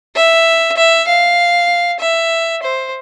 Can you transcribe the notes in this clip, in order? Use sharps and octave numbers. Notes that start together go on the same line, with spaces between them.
E5
E5
F5
E5
C5